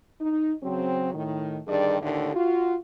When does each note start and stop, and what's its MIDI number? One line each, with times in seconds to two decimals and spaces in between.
0.21 0.53 63
0.63 1.10 49
0.63 1.10 54
0.63 1.10 60
1.14 1.59 45
1.14 1.59 51
1.67 1.97 43
1.67 1.97 50
1.67 1.97 51
1.67 1.97 55
1.67 1.97 68
1.67 1.97 74
2.01 2.31 39
2.01 2.31 45
2.01 2.31 50
2.01 2.31 51
2.01 2.31 57
2.34 2.75 65
2.34 2.75 66